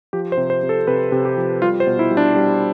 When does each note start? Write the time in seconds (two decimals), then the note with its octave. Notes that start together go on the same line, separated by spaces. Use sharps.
0.13 F3 G4
0.32 C5
0.37 C3
0.50 C5
0.63 C3
0.69 A4
0.87 C3 B4
1.12 C3
1.25 G4
1.37 F3
1.62 G3 F4
1.80 C5
1.87 B2
1.99 E4
2.11 G3
2.17 D4
2.36 G3